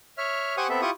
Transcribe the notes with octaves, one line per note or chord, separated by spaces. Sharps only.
C#5 E5 F6
G4 C5 F#5 G#5 C#6 D#6
B3 C4 A4 E5
E4 F4 G4 C#6 D#6